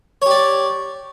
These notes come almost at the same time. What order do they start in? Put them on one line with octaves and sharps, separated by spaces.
C#5 G4 D5